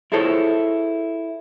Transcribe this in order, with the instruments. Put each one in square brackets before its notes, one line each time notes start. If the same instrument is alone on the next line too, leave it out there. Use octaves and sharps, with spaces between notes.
[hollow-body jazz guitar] E4 F4 G#4 A4 C5 C#5